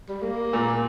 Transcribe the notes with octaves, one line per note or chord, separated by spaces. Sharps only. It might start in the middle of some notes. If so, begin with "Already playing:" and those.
G3
A#3
A#2